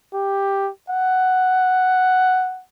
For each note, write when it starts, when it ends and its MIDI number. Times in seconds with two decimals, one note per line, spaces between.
0.14 0.70 67
0.90 2.63 78